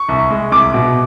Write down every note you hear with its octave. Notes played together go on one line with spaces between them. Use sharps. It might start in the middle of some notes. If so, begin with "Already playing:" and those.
Already playing: C#6
C2
G#3
C2 D6
B2